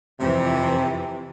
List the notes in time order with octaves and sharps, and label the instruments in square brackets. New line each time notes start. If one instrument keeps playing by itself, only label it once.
[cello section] F2 E3 [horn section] C3